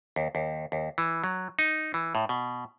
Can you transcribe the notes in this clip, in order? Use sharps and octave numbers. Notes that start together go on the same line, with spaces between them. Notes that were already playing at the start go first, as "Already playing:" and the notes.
D#2
D#2
D#2
E3
F#3
D#4
E3
A2
B2